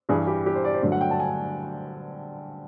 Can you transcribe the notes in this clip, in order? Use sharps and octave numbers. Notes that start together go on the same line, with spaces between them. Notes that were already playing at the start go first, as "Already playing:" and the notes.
G2 E3 G3 G#4
G4
G4
C5
D5
C5
G2 D3 F#3 A3 D5
F#5
G5
A5
G#5